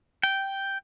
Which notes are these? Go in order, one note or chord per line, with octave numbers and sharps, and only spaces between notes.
G5